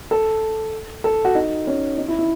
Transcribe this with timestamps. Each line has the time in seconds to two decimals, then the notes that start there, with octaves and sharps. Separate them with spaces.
0.11 A4
1.04 A4
1.25 F#4
1.35 D#4
1.67 C#4
1.98 D#4
2.08 E4
2.19 E4